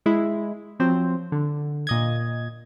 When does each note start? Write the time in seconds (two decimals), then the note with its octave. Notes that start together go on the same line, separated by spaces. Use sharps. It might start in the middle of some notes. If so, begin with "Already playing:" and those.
0.06 G#3 E4
0.79 F3 F#3 C4 C5
1.32 D3
1.87 A#2 D#5 G#6